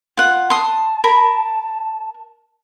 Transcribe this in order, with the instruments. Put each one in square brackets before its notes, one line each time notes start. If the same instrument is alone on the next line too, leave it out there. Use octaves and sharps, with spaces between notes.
[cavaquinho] F4 F#5
[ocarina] A5 [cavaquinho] C6 D#6
[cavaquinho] A#4 B5